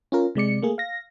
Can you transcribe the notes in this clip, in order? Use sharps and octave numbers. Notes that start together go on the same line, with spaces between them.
C#4 F4 A#4
C3 G#3 D5 C#7
A3 A#3 G#4
F5 A#6